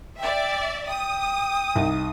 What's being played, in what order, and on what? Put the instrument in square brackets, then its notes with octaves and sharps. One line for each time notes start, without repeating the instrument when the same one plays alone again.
[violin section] D5 E5 [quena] G5
[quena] G5 [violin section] D#6
[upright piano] C2 D#4